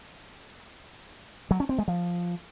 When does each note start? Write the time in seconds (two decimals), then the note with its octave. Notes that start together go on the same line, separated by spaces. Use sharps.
1.51 F#3
1.60 C#4
1.69 C4
1.78 G#3
1.88 F3